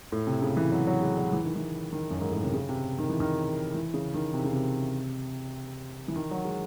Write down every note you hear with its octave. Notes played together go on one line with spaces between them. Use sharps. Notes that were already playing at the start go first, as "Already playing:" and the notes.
A2
C3
C#3
E3
F#3
F#3
G#3
F#3
E3
D#3
E3
D#3
F#2
G#2
A2
C3
C#3
C3
D#3
E3
D#3
E3
C#3
D#3
C3
C#3
C3
E3
D#3
F#3
G#3